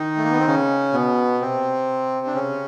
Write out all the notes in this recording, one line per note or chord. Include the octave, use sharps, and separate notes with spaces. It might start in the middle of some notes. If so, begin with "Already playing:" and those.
Already playing: D#3 D#4
A3
A#3
B3
C4
C#3 C#4
B2 B3
C3 C4
D4
C#3 C#4